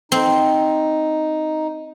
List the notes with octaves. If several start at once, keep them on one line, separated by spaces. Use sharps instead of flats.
C4 D#4